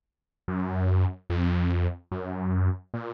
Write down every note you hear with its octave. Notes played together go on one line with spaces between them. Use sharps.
F#2
F2
F#2
A#2